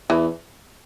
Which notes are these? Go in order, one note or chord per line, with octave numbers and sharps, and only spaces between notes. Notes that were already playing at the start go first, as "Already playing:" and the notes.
E2 E3